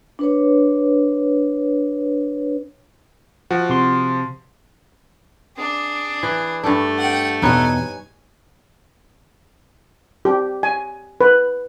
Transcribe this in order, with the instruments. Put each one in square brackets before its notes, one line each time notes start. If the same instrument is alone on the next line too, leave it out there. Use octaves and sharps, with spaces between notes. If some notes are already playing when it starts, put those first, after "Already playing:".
[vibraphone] D4 B4 C#5
[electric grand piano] F3 F#4
[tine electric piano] C3 C6
[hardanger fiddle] D4 G#4
[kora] E3
[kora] G2 D4 [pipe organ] A3 A4
[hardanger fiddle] F#5 G5
[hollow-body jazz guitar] E2 B2 [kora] D#4 B4 C#5 [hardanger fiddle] G#5
[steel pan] G4
G#5
B4